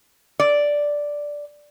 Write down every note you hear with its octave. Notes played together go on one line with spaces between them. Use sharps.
D5